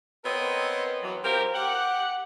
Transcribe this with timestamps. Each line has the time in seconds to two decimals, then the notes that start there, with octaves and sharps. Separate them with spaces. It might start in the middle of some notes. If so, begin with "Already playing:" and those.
0.24 B3 C4 A#4 C#5 D#5
1.02 E3 F#3
1.24 C4 F4 G4 A#4
1.54 G4 F#5